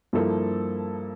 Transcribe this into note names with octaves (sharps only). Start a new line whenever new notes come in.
G2 F3 A#3 E4 A4